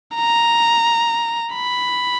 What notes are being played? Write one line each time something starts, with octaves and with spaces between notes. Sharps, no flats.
A#5
B5